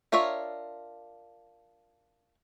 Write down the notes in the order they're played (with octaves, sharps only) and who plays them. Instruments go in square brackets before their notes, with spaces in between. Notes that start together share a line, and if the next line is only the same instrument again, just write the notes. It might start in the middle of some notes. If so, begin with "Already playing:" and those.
[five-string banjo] D4 F4 A#4 C#5 E5